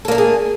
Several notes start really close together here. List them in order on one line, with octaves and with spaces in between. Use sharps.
A4 A#3 D4 A3 G#4